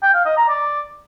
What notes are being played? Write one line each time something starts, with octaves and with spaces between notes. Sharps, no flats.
G5
F5
D#5
A#5
D5